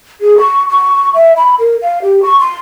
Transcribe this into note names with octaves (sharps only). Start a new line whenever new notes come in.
G#4
C#6
C#6
E5
B5
A#4
F5
G4
C#6
C6